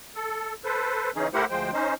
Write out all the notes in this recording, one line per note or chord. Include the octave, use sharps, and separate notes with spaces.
A4
A4 B4 C5
C#3 E3 C#4 D#4 G#4
A3 E4 G4 A#4 C5 F#5
D2 F3 G#3 C5 G5
C#4 D#4 C5